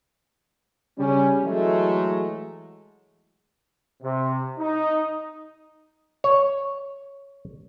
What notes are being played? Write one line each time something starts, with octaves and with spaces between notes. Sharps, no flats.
C#3 G3 C#4
E3 F#3 G#3 A3
C3
D#4
C#5